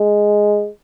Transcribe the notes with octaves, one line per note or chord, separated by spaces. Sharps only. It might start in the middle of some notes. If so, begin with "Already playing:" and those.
Already playing: G#3